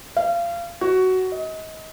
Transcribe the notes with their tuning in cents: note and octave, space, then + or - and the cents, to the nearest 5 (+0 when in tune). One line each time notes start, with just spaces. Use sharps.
F5 -30
F#4 +10
D#5 +30